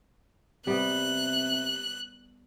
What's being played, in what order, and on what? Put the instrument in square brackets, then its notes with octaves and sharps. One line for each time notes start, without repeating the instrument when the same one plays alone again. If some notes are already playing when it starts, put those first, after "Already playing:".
[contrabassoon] C3 [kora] G3 B3 [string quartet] F#6